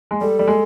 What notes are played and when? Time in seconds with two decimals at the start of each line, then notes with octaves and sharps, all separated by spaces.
0.11 G#3
0.21 G3 A4
0.39 G3
0.47 G#3